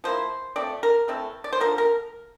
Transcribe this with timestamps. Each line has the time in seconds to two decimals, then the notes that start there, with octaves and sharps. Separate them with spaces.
0.04 F3 A#3 E4 C5
0.56 F3 A3 C4 D5
0.83 A#4
1.08 E3 A3 C4 E4
1.44 D5
1.53 C5
1.60 D3 F3 A#3 A#4
1.78 A#4